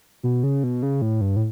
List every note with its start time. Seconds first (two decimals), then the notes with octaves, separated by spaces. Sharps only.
0.23 B2
0.43 C#3
0.64 B2
0.83 C#3
1.02 A2
1.21 G2
1.36 A2